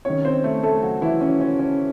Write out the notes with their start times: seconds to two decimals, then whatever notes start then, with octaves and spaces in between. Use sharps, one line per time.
0.05 C3 D#3 C#4 C#5
0.25 C4 C5
0.44 A3 A4
0.63 A3 A4
0.82 F#3 F#4
1.02 E3 E4
1.21 C#4
1.40 C#4
1.59 C#4